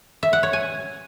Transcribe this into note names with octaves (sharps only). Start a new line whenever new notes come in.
E5
F#5
C#5
G#5